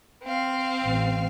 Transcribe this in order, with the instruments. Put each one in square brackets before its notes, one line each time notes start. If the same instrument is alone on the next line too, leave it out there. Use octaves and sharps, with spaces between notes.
[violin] C4 F5
[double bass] A1